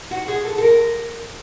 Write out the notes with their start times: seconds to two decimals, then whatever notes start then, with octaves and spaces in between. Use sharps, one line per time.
0.11 F#4
0.28 G#4
0.45 A4
0.58 A4
0.62 A#4